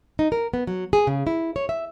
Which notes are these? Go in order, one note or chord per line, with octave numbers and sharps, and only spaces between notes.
D#4
A#4
B3
F#3
G#4
C#3
E4
C#5
E5